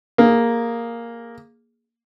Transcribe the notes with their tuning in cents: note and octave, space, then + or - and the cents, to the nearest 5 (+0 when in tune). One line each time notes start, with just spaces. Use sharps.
A#3 +0 G#4 +0